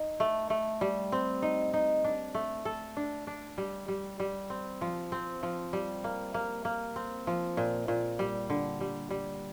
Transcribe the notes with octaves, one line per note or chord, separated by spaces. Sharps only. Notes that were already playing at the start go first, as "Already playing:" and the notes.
Already playing: D#4
A3
A3
G3
C4
D#4
D#4
D4
A3
A4
D4
D4
G3
G3
G3
C4
F3
C4
F3
G3
A#3
A#3
A#3
C4
F3
A#2
A#2
G3
D3
G3
G3